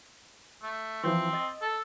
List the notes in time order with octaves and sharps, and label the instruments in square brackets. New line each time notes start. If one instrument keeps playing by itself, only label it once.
[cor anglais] A3
[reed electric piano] E3 F3 E4 [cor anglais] C4
[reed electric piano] D#5 A6
[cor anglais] A4